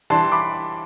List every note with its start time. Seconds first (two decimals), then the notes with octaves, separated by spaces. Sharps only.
0.10 E3 G3 D4 A5 C6
0.32 B5 D6